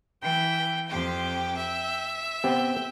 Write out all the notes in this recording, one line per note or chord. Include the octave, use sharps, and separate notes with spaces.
E3 G5
F2 G4 G5
E5
B3 C4 G4 G5